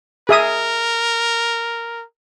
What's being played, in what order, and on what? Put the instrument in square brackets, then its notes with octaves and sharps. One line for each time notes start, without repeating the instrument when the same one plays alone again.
[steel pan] G#4 E5 D#6 [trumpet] A#4